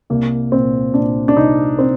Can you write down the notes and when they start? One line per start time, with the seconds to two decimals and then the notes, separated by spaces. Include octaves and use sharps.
0.10 C2 A#3
0.52 A#2 C4
0.94 A#2 D4
1.28 D4
1.36 C2 D#4
1.79 C4